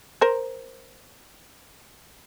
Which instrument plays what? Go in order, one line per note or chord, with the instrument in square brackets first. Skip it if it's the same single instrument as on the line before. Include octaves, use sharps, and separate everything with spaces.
[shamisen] A#4 C5